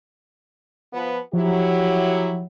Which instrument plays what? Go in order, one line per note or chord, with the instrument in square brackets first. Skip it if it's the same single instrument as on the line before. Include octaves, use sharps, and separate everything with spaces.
[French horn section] F3 B3 B4
[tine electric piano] F3 [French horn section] F#3 E4 G4